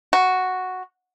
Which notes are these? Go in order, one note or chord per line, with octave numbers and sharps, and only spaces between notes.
F#4